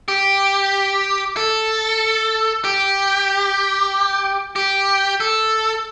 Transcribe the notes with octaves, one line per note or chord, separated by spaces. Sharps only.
G4
A4
G4
G4
A4